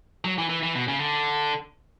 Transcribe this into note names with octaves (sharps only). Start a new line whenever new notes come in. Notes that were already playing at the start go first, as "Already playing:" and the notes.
F#3
E3
E3
E3
B2
C#3
D3